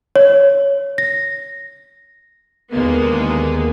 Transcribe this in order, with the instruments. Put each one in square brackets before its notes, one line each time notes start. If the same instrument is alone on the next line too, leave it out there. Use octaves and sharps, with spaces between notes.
[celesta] C#5
A#6
[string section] D#2 D3 G#3 A#3 B3